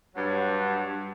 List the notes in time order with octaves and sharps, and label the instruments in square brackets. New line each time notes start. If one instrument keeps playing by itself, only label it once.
[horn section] G2 F#3 F#5